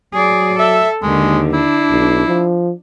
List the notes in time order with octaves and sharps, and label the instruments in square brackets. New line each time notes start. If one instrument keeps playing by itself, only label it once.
[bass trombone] F#3 [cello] G#4 D5
[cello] A4 [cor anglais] E5
[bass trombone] D#2 [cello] D3 D#3 [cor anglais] G#3
[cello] D4 [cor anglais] E4
[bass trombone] B1
F3